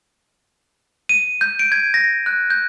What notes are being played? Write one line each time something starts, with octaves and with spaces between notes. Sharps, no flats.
D#7
G6
D7
G#6
A#6
F#6
G6